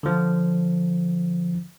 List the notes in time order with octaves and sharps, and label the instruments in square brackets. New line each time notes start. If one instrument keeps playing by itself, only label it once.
[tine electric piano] D3 F3